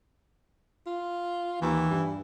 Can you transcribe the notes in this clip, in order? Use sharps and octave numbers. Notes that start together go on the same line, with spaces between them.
F4
D#2 E3
G2